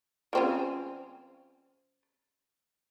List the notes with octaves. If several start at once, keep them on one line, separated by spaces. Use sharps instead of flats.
F3 C4 C#4